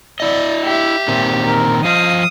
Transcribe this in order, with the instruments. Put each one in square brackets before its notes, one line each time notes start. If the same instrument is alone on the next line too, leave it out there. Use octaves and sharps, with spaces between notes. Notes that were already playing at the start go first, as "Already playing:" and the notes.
[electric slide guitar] E4 D#5 [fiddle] D5
[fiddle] G4 [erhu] E5
[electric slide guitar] A#2 D#3 C4
[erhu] A#4
[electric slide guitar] F3 F4 D#5 [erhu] F5 [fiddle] D#6